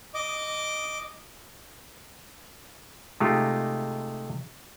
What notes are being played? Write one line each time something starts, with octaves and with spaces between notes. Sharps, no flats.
D#5 D6
C3 G#3 A3 D#4 F4 G4